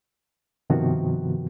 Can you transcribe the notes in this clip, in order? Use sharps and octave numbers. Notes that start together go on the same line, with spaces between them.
G2 C3 D#3 F3 B3 F#4